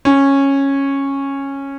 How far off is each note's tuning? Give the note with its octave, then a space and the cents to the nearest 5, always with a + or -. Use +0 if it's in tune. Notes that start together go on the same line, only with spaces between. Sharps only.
C#4 -10